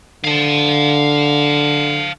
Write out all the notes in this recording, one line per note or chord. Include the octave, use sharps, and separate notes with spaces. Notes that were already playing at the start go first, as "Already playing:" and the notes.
D3 F5 A5